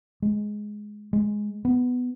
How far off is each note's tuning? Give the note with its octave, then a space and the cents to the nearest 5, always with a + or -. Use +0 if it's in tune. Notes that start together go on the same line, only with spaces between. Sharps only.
G#3 +10
G#3 +5
B3 +10